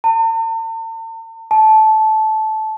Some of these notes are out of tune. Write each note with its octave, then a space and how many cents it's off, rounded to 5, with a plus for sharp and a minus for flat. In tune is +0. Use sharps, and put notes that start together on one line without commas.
A5 +45
A5 -15